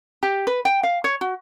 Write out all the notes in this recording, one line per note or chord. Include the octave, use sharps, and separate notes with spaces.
G4
B4
G5
F5
C#5
F#4